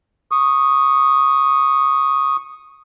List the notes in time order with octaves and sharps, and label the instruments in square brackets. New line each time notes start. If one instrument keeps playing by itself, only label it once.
[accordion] C#6 D#6